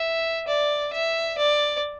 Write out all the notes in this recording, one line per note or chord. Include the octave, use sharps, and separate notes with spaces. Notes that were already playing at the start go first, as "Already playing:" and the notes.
Already playing: E5
D5
E5
D5